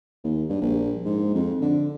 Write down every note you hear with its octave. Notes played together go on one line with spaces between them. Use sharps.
D#2
G2
A#1
G#2
F2
D3